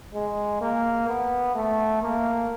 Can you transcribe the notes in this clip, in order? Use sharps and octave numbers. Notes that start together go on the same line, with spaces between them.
G#3
A#3
B3
A3
A#3